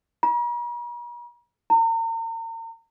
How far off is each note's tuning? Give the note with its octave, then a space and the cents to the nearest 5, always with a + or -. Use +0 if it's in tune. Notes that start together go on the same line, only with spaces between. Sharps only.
A#5 +45
A#5 -40